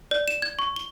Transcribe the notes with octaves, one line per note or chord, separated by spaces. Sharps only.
D5
E7
G#6
C#6
G7